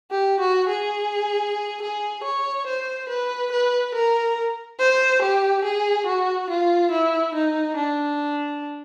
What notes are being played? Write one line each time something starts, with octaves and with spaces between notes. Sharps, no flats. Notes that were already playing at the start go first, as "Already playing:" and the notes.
G4
F#4
G#4
G#4
C#5
C5
B4
B4
A#4
C5
G4
G#4
F#4
F4
E4
D#4
D4